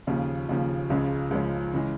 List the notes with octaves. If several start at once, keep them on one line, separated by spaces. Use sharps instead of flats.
D#2 C#3 F3
D#2 C#3 F3
C#2 C#3 F3 G#3 C#4
C#2 C#3 F3 G#3 C#4
C#3 E3 G#3